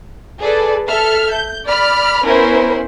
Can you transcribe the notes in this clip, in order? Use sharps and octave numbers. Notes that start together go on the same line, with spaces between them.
G#4 A4 B4 D5
A4 E5 F6
G6
D5 B5 F6
B3 C#4 E4 A#4 C5